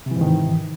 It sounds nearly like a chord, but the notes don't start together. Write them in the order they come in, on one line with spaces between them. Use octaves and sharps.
C3 E3 G#2 D#3